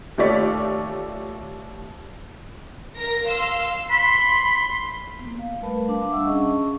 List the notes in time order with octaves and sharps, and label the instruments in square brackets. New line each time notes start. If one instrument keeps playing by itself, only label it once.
[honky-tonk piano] D#2 A3 F4 C#5 D5 B6
[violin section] A#4 A#6
F5 C6 E6
[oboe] B5 [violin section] C6
[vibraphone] A#3 B3
F5
G3 A3 A#4 B4 A5 B5
D4 F5 A5 D6
G3 D4 E5 F#5 A5 E6
C#4 G#4 D#5 C#6